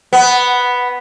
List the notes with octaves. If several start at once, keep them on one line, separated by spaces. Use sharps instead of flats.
B3